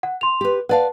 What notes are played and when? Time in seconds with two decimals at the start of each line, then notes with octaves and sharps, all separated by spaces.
0.03 F#5
0.21 C6 F7
0.41 G4 B4
0.69 B4 D5 F5 F#5 A5